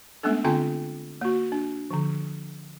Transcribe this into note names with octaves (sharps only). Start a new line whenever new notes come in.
G#3 A3 B3 C#4 D4 A4
D3 C4 F4 G5 G#5 C6
A#3 F#4
D4
D3 F3